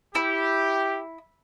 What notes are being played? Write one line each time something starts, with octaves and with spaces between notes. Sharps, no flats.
E4 G4